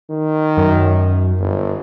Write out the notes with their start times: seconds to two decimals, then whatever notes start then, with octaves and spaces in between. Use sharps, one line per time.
0.10 D#3
0.57 F#2
1.40 G1